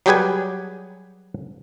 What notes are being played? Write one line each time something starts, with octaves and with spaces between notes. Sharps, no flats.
F#3 G3 G4 G#4 B4 G#5